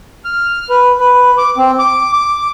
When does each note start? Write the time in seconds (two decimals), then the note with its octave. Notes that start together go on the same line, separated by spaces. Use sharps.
0.25 F6
0.69 B4
1.00 B4
1.38 D6
1.57 C4
1.79 D6
2.13 D6